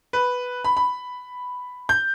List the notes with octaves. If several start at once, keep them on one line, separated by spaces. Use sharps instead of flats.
B4
B5
B5
G6